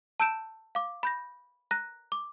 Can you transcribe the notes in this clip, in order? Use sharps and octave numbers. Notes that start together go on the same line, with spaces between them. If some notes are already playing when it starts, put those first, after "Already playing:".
A5 E6 G6 D7 E7
F5 D6
B5 G6 A#6
A#5 F#6 A#6
D6